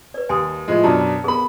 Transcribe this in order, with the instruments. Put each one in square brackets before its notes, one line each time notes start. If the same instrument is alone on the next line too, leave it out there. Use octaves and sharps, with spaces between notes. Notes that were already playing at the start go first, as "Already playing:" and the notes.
[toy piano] B4 D5
[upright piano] D#2 [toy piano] G#5 C6 D#6
[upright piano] A2 F3 G#3
[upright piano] F#2 B2 D4 [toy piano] A5 A#5
[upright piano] B3 B5 [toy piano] G#4 A#4